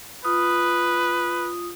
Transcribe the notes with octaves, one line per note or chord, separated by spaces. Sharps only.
F4 B4 D#6